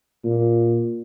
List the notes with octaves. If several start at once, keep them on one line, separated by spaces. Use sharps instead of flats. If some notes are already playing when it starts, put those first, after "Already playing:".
A#2